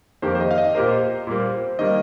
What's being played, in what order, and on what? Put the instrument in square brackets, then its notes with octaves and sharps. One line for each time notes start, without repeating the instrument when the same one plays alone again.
[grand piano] F2 D#3 A#3 G4 [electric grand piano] C5
[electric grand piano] C5
D#5
F5
D#5
[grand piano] A#2 A#3 G4 A#4 [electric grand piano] C5
[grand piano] A#2 G3 A#3
[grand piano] D#3 G3 A#3 [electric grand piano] D#5